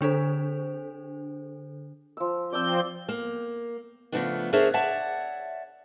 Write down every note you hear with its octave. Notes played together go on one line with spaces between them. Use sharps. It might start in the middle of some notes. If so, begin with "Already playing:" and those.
D3 D4 A4 C5
F3 E6
F3 C4 D5 A5 E6 G6
A#3
C#3 F3 A3 B3 D4
D4 G#4 A#4 C5 C#5 E5
C#5 D5 E5 F#5 A5